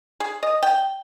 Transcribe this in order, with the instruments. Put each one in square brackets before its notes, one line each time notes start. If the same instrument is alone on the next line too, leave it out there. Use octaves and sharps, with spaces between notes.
[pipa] G#4
D#5
G5